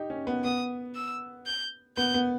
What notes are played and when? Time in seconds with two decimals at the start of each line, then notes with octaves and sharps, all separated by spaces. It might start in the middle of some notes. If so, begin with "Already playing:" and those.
Already playing: D#4 G4
0.10 C#4
0.27 B3
0.44 B3 D#6
0.95 E6
1.46 G6
1.97 B3 G6
2.14 B3